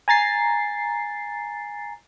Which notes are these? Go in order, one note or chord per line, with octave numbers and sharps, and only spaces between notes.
G#5 A#5 A6 C7